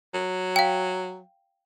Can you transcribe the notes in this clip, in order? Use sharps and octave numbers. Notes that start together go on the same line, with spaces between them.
F#3
F5 G5